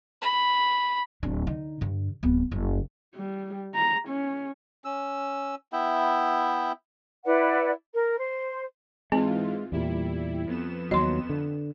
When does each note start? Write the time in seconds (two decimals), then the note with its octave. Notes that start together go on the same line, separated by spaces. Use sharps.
0.21 B5
1.23 D1 D4
1.47 D3 D#4
1.81 G2 D3
2.23 D1 B3
2.51 F#1 G3
3.15 G3
3.74 A#5
4.08 C#4
4.85 C#4 E6
5.73 B3 E4 E5 G5
7.25 E4 B4 D5 F#5
7.93 A#4
8.19 C5
9.12 G#2 E3 G#3 C4 F4 G#5
9.72 E2 A#2 G3 E4
10.46 F2 B3 E7
10.91 D#2 F#3 D#5 C6
11.29 D3